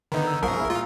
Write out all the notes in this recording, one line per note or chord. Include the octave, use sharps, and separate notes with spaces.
D3 D#3 B3 D#4 A#5
E6
A#1 F#2 F3 A#4 D#6
E4 G#4 E6
A#2 F4